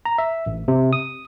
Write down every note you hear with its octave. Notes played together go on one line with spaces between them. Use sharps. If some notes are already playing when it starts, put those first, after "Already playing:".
A#5
E5
A1
C3
D#6